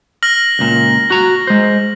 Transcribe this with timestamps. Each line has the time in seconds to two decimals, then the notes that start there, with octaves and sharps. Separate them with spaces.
0.23 F6 A#6 F#7
0.59 C#2 A#2
1.10 F#4 A#5
1.47 G#3 C5